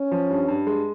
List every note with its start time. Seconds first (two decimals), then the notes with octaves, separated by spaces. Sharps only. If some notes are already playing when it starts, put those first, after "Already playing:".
Already playing: C#4
0.11 F3
0.30 G2
0.48 G2
0.67 G#3